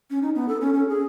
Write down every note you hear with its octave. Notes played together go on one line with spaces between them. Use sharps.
C#4
D#4
B3
A4
C#4
C#4
G#4